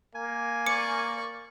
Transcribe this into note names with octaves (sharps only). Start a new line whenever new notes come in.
A#3 G#5
D5 C#6 D6 C#7